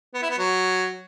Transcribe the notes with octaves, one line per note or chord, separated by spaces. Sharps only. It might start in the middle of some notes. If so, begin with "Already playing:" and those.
B3
E4
B3
F#3